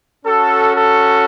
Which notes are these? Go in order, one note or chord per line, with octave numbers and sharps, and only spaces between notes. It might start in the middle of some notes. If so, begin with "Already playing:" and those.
C#4 F#4 A4
A4